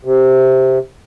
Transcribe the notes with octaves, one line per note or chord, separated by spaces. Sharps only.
C3